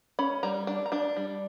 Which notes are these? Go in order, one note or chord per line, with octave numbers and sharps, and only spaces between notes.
C#4 B5
G3 A#5
D4 A5
A#5
D4 A5
G3